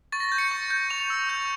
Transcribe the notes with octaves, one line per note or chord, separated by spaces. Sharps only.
C#6 A6
A#6
A6
G6
C#7
C#6
G6
C#6 F7
E6
G6